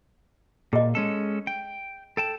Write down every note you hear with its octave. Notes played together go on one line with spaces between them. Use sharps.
A#2 G#4 D#5
G#3 C#4 A4
G5
A4 G5 A5